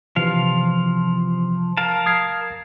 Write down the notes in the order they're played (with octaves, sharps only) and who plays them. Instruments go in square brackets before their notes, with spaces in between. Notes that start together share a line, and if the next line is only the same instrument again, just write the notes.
[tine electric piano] C3 E3 [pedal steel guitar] F3 F5
[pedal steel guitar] A#4 F5 A5
[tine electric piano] D#6 G#6 C7